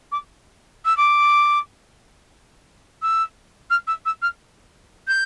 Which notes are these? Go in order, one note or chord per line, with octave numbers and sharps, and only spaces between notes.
D6
E6
D6
E6
F6
E6
E6
F6
G6